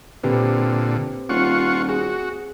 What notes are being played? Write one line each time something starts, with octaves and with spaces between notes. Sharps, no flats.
A#2 D3 C4 G4 B4
D#1 F4 F#5 C#6
F#4 G#4